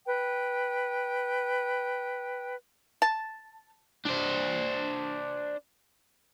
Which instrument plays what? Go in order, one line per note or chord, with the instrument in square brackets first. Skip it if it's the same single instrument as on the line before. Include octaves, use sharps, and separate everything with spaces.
[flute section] B4 G5
[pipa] A5
[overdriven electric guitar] D4 C5